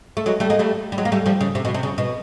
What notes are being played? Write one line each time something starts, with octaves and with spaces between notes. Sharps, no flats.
A3
F#3 G#3
G3 A3
G#3 A#3
G3 A3
G3
F#3 G#3
A#3
G3 A3
F3 G3
C#3
C3
B2
C3
C#3
B2